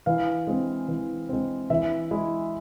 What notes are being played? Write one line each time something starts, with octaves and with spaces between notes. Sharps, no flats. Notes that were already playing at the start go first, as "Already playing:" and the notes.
E3 F5
G#3 C4
E3
G#3 C4
E3 E5
G#3 E4